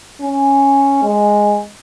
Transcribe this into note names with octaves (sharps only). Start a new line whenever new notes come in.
C#4
G#3